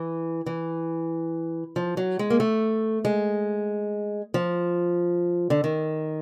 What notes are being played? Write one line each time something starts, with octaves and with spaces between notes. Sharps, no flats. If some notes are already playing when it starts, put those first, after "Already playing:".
Already playing: E3
E3
F3
F#3
G#3
A#3
A3
G#3
F3
D3
D#3